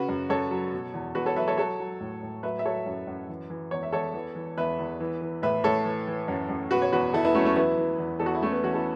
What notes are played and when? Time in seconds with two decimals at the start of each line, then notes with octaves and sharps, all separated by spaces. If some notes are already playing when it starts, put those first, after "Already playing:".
Already playing: C#3 F#4 B4
0.09 F#2
0.29 F#2 A4 C#5
0.51 F#3
0.73 B2
0.94 E2
1.15 E2 F#4 B4
1.26 A4 C#5
1.36 F#3 B4 E5
1.47 A4 C#5
1.58 F#3 A4 C#5
1.80 F#3
2.00 A2
2.22 A2
2.43 F#3 B4 E5
2.59 E5
2.65 F#3 A4 C#5
2.86 F#2
3.07 F#2
3.29 E3
3.50 E3
3.71 E2 C#5
3.83 E5
3.92 E2 A4 C#5
4.14 E3
4.35 E3
4.58 E2 B4 E5
4.79 E2
5.00 E3
5.22 E3
5.42 A2 B4 E5
5.64 A2 A4 C#5
5.85 E3
6.07 E3
6.28 F#2
6.49 F#2
6.71 B2 F#4 B4
6.82 C#5
6.92 E2 F#4 B4
7.13 E2 E4 A4
7.25 B3 E4
7.34 F#3 A3 C#4
7.45 A3 C#4
7.56 E3 B3 E4
7.77 E3
7.99 E2
8.20 E2 A4
8.26 F#4
8.35 E4
8.41 E3 A3 C#4
8.52 B3
8.63 E3 C#4 F#4
8.74 E4 A4